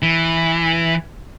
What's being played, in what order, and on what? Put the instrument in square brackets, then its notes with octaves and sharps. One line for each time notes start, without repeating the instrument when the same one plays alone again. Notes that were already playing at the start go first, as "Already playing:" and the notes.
[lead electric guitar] E3